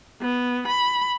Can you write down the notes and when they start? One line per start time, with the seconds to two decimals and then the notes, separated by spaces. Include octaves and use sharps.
0.21 B3
0.67 B5